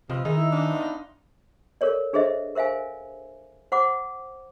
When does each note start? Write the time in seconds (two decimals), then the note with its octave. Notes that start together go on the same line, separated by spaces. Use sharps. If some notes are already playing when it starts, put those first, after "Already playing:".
0.09 C3 F3 C4 B4 D#5
0.25 D#3 D#4 G#4 D#5 E5
0.37 E4
0.52 E3 D4 F4
0.72 B3 F4 D#5
1.81 A4 A#4 C#5 D5
2.13 D4 G#4 A4 C5 D#5 E5
2.55 A#4 C5 E5 F5 G#5
3.72 C5 F#5 B5 D6